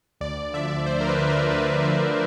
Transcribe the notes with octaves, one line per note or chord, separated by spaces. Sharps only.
D2 D5
D3 F3 E5
D2 C5
A#4
B4
D3 F3
A#4
D2 B4
D3 F3 B4